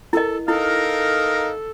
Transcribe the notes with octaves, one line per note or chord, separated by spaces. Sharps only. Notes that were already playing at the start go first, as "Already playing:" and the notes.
E4 A4 A#4 D#5
D#4 E4 A4 A#4 F5